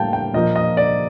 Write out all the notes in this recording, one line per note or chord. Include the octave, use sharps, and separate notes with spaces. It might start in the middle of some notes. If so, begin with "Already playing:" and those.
Already playing: A2 G3 A#3 F5 G5 A5
G5
A#2 F3 A#3 D#5
D#5
D5